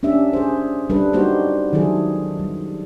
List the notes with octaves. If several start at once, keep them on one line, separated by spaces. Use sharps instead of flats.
C#4 D4 G4 E5
G#4 C5
G3 D4 A4 B4
G3 A#3 D#4 F#4 G4 C5
D#3 F#3 E4 G#4 A4
G3